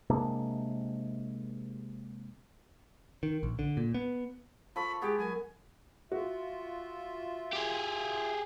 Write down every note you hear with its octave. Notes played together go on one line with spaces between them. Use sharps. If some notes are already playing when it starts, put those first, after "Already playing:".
C3 G#3 A#3 D4
D#3
A#1
D3
A#2
B3
F3 A4 B5 C#6
G#3 B3 G4 G#4
F#3 A#4 G#5
F4 F#4 E5
G4 G#4